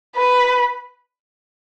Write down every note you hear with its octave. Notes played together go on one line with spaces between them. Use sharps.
B4